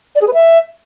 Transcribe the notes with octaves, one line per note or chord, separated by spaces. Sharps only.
D5
G#4
B4
E5